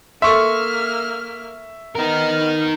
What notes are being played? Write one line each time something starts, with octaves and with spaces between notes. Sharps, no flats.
A#3 A4 E5 C6 C#6 F6
B3 D#4 A#4 F6